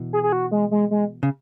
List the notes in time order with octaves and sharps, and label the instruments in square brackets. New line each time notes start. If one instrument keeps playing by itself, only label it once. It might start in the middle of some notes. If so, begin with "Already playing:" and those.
Already playing: [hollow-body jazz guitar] B2 E3
[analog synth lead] G#4
G#4
F#4
G#3
G#3
G#3
[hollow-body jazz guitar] C#3